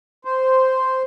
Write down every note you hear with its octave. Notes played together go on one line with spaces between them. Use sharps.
C5